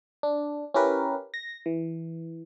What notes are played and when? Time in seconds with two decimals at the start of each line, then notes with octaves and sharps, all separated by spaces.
0.23 D4
0.74 C#4 E4 G4 A#4 B4
1.34 A#6
1.66 E3